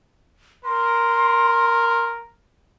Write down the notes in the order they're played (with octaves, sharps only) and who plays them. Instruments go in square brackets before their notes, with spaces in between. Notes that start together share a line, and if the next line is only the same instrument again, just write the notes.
[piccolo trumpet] A#4 [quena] C6